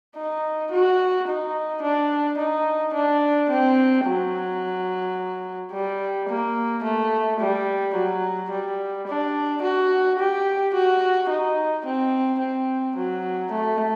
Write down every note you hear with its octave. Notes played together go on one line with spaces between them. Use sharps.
D#4
F#4
D#4
D4
D#4
D4
C4
F#3
G3
A#3
A3
G3
F#3
G3
D4
F#4
G4
F#4
D#4
C4
C4
F#3
A3